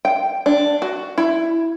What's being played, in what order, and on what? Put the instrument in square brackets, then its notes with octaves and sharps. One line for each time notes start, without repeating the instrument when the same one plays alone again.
[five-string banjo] G5
D4
F#4
E4